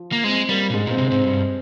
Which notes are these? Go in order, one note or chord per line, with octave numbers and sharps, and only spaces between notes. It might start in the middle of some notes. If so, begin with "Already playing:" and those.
Already playing: F3
A#3
G#3 C4
G3 A#3
A#2
G#2 G#3
A#2 C4
C3
G#2 C4
G2